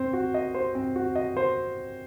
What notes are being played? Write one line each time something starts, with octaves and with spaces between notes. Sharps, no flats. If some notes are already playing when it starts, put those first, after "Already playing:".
Already playing: C4 C5
F#4
D#5
C5
C4
F#4
D#5
C5